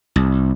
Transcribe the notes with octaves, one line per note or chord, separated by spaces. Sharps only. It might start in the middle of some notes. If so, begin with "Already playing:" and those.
C2